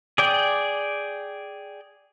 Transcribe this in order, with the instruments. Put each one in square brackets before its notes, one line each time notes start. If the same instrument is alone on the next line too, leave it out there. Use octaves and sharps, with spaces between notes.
[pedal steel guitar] G#4 D5 G5